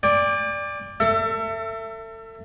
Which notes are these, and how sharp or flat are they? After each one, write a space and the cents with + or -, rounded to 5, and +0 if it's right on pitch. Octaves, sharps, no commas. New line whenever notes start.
D5 +0 G5 +40
A4 +35 E5 +20